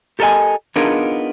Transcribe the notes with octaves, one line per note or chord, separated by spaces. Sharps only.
G4 A4 A#4 C5 D#5 G#5
B3 D4 D#4 F4 G#4 A#4